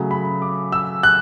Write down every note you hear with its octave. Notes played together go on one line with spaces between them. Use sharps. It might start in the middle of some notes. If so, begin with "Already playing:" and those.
Already playing: C#3 F#3 A3
B5
D6
E6
F#6